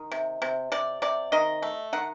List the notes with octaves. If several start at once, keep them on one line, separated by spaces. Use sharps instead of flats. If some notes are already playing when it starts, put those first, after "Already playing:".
Already playing: D#3
C3
C3
C3 D5
C3 D5
D#3 D#5
A3
D#3 F#5